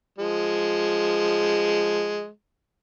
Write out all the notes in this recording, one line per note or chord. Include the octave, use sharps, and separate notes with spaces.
F3 G#3